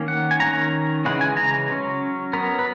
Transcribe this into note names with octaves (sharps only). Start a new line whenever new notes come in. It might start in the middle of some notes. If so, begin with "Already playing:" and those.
Already playing: D#3 A#3 C#4
F#5
G#5
D#3 A#3 C#4 A#5
C#3 E3 G#3 C#4 F#5
G#5
A#5
F#3 C#4
F#3 B3 A#4
B4